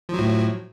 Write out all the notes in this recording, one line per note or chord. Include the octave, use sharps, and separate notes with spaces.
A2 F3 F#3